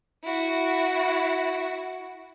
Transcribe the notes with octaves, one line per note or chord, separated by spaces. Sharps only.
E4 F#4